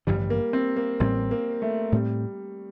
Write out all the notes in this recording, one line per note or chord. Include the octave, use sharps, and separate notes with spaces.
A1 G2 D3 F3 G3
A#3
C4
A#3
A1 A2 G3 C4
A#3
A3
A2 G3 A3 C4